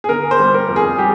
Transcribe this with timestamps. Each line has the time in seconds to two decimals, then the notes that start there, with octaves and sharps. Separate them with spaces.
0.04 G#4
0.09 D3 A#4
0.31 C5
0.39 G3
0.54 A#4
0.68 F2
0.76 G#4
0.98 G3 G4